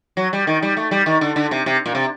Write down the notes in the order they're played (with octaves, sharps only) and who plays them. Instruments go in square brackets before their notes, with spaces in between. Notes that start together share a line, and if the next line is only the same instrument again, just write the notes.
[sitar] F#3
G3
D#3
G3
A3
G3
D#3
D3
D3
C3
C3
A#2
C3